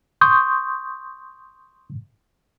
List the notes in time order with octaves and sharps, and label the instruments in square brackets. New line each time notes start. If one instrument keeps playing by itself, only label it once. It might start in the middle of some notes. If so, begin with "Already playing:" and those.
[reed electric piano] C6 C#6 D#6 G6